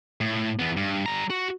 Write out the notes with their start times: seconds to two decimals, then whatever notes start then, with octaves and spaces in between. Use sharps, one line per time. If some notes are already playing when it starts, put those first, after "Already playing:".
0.21 A2
0.59 E2 B3
0.77 G2
1.06 G3 A#5
1.30 F#4